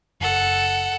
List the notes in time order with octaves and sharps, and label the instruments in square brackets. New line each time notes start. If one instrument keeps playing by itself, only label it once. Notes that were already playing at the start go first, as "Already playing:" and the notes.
[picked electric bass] F#1 [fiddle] A4 F#5